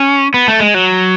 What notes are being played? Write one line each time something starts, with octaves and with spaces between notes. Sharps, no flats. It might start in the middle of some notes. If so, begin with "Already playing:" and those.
Already playing: C#4
B3
A3
G#3
F#3